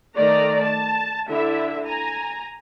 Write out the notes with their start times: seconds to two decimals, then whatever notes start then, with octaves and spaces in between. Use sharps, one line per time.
0.17 D#3 A3 D5 A#5
0.63 A5
1.30 D3 E4 E5
1.86 G#5 A#5